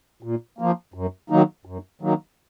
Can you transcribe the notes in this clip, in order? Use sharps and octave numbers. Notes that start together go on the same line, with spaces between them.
A#2
F3 A#3
F#2
D#3 F#3 A#3 D#4
F#2
D#3 F#3 A#3 D#4